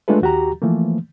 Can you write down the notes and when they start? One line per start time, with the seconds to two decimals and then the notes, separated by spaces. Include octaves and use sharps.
0.08 G#3 A3 D4 F4 A4 B4
0.22 D#2 F#4 G4 A#5
0.62 E3 F3 A3 A#3